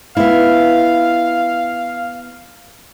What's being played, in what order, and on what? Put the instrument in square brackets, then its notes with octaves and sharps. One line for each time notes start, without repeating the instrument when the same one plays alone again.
[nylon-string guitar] B3 E4 [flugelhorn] F5